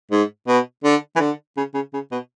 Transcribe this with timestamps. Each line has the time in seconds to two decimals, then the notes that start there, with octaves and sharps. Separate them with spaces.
0.11 G#2
0.47 B2
0.84 D3
1.16 E3
1.20 D3
1.57 C#3
1.74 C#3
1.93 C#3
2.12 B2